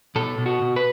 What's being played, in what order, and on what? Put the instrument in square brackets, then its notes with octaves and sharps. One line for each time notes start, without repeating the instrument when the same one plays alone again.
[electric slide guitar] B2 A4
B2
F#4
B2
B4